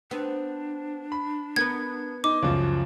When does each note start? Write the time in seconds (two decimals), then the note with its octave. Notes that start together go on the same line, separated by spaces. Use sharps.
0.11 B3 C4 D4
1.12 B5
1.56 B3 A#4 B4 G#6
2.24 D#4 D6
2.43 C#2 F#2 F3